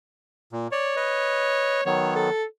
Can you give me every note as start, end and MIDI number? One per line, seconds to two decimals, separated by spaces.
0.52 0.68 46
0.72 1.82 73
0.72 0.95 74
0.96 1.81 71
0.96 1.81 75
1.86 2.30 51
1.86 2.30 54
1.86 2.30 59
1.86 2.11 73
2.15 2.44 69